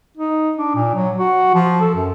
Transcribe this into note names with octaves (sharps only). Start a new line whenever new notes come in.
D#4
D4
A#2
F#3
F#4
F3
A4
F#2